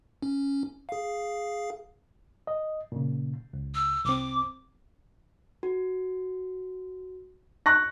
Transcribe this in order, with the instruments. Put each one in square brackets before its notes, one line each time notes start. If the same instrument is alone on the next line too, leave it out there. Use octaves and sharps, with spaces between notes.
[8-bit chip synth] C#4
G#4 F5
[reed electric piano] D#5
A#2 C#3
C#2
[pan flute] E6
[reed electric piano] C2 C4 [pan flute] D6
[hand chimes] F#4
[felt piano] C#6 F#6 A#6